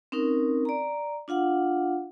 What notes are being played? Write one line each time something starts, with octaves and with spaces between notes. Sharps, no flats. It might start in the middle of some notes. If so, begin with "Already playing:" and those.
C4 C#4 D#4 A#4
D5 A#5
D4 F4 F5 F#5